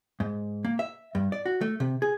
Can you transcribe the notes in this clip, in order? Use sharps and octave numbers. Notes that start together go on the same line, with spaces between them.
G#2
A#3
E5
G2
D5
F#4
A3
C3
G#4